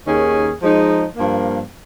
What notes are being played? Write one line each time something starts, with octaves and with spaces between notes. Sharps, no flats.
D#2 D#3 A#3 C#4 G#4
F3 G#3 D#4
G2 F3 A#3